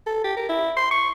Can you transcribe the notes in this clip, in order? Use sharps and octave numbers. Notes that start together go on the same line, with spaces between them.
A4
G4
A#4
E4
C6
C#6